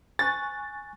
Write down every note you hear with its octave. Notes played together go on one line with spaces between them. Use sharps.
G#5 C#6 F#6 A6